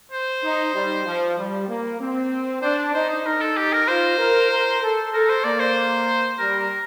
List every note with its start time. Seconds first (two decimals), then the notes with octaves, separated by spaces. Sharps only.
0.12 C5
0.43 D#4
0.75 G3
1.05 F3
1.37 G3
1.68 A#3
2.00 C4
2.62 D4 C5
2.94 D#4 C5
3.09 C5
3.26 D#4 A#4
3.41 A4
3.57 G4
3.73 A#4
3.88 F4 C5
4.19 A#4
4.51 A#4
4.82 A4
5.13 A4 A#4
5.29 C5
5.44 A#3 D5
5.60 C5
6.38 G3 A#4
6.60 A#4